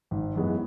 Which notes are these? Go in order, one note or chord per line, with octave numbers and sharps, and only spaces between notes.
G#1
F#2 E3 G#3 B3